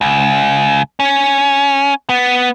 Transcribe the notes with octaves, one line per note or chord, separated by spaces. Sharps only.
C#2
C#4
B3